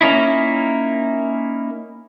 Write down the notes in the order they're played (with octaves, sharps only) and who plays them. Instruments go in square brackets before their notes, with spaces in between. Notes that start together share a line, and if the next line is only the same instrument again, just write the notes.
[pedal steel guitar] A#3 C#4 D#4 E4